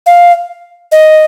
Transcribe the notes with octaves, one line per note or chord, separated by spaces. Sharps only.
F5
D#5